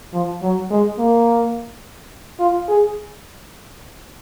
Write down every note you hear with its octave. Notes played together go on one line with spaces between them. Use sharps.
F3
F#3
G#3
A#3
F4
G#4